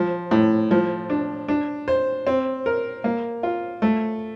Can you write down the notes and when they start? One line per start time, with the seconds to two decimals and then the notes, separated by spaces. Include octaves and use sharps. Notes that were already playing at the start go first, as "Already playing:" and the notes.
Already playing: F3
0.31 A2
0.71 F3
1.10 D4
1.48 D4
1.88 C5
2.27 C4
2.66 A#4
3.04 A#3
3.43 F4
3.82 A3